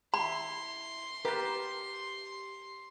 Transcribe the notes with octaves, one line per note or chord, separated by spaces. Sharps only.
E4 B5 C6
G4 A#4 B4 A5